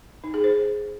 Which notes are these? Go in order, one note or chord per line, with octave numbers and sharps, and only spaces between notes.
D#4
G#4
C5